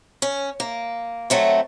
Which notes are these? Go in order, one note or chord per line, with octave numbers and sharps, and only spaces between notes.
C#4
A#3
F#3 A3 C4